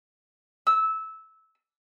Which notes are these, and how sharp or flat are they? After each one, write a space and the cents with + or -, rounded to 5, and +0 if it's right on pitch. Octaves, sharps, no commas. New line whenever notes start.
E6 -15